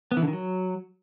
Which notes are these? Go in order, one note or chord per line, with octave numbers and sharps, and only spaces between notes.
B3
E3
D3
D#3
F#3